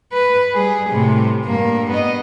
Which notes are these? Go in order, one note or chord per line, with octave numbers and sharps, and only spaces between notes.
B4
G3 G#4
A2 C3
G2 A#3
B3 D#5